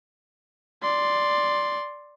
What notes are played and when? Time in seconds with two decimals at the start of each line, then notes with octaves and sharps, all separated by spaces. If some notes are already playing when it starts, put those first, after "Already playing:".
0.83 D5 C6